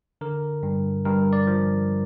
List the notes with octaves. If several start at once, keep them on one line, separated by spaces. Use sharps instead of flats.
D3 A#4
G2
G2 A#4
D5
F3